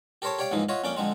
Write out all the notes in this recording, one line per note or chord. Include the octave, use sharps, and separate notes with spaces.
G4 A4 A#4 C5 C#5 A5
G4 C#5 D5 F5 G5
D#2 G#2 E3 F3 D#4
F4 C#5 D#5 E5 F#5
F2 A#3 C#4 D5 D6
F2 D3 G#3 C4